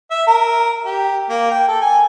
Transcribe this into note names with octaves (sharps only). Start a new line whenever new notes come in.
E5
A#4
G4
A#3
G5
A4
G#5